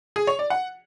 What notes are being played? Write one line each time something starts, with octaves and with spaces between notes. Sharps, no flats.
G#4
C#5
D5
F#5